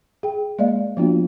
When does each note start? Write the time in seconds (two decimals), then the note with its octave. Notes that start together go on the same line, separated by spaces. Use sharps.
0.23 G#4 G5
0.59 G#3 A#3 D5 D#5 F5
0.97 F3 A#3 B3 D4 F4 F#4